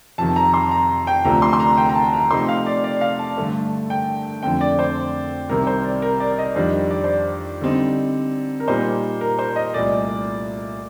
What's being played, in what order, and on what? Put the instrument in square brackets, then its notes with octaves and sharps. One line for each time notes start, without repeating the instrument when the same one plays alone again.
[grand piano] F2 C3 D#3 [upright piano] A5
[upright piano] A#5
C6
A#5
G5
[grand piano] D2 C3 F3 A3 D4 [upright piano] A#5
[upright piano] C6
C6
A#5
G5
A#5
A5
A#5
[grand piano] C3 F3 A3 D#4 [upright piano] C6
[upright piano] F5
D5
D5
F5
A5
[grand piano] G2 D3 A3
[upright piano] G5
[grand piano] F2 D3 A3 C4 [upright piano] G5
[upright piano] D5
C5
[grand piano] C2 C3 D#3 [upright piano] A#4
[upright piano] C5
D5
A#4
D5
D5
D#5
[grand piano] F2 D#3 G3 D4 [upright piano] C5
[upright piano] D5
C5
D5
[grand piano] D3 G3 C4 D#4
[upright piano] A#4
[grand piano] A#2 G3 A#3 D#4 [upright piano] C5
[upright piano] A#4
C5
D#5
[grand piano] C2 A#2 A3 [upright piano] D5